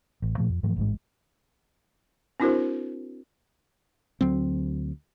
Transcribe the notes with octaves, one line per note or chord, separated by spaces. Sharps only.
A1
A#2 F3 A3
F2
G#2 E3 F3 A3
A1 G#2 G#3
C4 D4 E4 F#4 A#4 C5
D2 F#3 C4